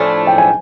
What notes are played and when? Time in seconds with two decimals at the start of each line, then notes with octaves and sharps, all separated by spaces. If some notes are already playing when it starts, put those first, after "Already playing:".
Already playing: A2 F3 A3 D4 G#5
0.27 G5
0.38 G#5